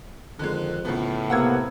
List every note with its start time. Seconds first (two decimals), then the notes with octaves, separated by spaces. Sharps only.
0.39 F2 D3 D#3 G#3
0.85 A2 C#3 F3 B3
1.30 C3 A#3 B3 F#5 E6 G#6